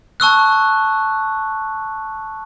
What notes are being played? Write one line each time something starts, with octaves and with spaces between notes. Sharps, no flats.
A5 C#6 E6 F#6